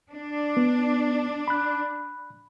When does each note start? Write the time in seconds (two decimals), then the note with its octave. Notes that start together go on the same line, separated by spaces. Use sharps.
0.10 D4
0.57 B3
1.48 B5 F#6